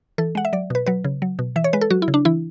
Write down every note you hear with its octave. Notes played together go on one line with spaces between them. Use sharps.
E3 A4
G#3 F#5
E5
F#3 D5
B2 B4
F#3 B4
C#3
F#3
B2
E3 E5
C#5
G#3 B4
A4
F#3 F#4
E4
C#3
D4
E3 E4